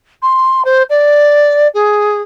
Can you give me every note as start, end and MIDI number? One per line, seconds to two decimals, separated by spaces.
0.22 0.62 84
0.65 0.82 72
0.89 1.67 74
1.74 2.21 68